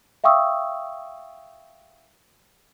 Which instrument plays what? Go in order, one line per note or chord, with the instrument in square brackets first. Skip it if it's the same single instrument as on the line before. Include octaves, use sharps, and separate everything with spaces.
[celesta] E5 F5 G5 C#6 D#6 E6